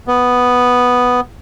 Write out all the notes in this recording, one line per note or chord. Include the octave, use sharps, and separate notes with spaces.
B3